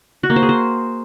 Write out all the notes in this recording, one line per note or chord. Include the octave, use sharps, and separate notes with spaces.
F#4
A#3
C5
G#4
C5